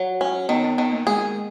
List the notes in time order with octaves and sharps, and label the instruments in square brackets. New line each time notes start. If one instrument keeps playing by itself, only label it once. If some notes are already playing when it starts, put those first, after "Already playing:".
Already playing: [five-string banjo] F#3
C#4
[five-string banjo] D#3 [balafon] B3
[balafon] B3
[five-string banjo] D#3 [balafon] B3
[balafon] A#3
[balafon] G#3 [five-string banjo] G#4